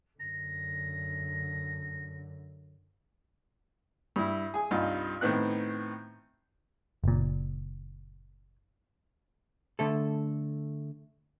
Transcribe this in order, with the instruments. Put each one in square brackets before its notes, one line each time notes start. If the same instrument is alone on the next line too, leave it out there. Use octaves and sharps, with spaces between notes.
[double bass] F#2 D3 [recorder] A#6
[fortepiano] G2 E4
G#4 G#5
C2 G2 D#4 F4
A2 D#3 B3 C4 F#6
[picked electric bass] F#1 A#2
[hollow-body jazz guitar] D3 A3 A4